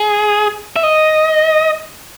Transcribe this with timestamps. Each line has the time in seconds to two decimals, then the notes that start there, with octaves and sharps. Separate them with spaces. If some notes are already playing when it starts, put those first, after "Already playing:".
Already playing: G#4
0.76 E5
0.83 D#5